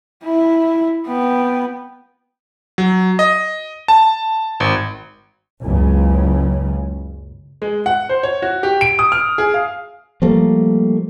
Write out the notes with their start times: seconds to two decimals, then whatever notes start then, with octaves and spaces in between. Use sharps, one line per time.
0.24 E4
1.07 B3 G5
2.78 F#3
3.19 D#5
3.88 A5
4.60 G#1
5.63 F#1 C#2 C#3
7.62 G#3
7.86 F#5
8.09 C5
8.23 C#5
8.42 F#4
8.63 G4
8.81 D7
8.99 D#6
9.12 F6
9.38 G#4
9.54 F5
10.22 F3 G3 A3 A#3